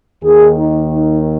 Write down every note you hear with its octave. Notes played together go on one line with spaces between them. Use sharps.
D#2 D#3 G#4
D#4
D#4